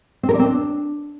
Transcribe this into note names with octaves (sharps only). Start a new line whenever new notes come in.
C4
A#4
D5
C4
D4